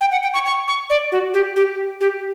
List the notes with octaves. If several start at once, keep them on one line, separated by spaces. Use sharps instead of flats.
G5
F#5
G5
C#6
C#6
C#6
D5
F#4
G4
G4
G4